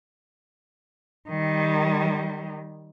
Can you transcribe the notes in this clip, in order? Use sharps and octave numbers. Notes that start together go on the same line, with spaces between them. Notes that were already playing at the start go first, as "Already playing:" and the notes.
D#3 G3